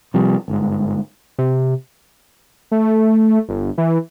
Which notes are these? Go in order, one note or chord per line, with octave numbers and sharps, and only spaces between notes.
C3 F3 G3
G1 G#2
C3
A3
G1
E3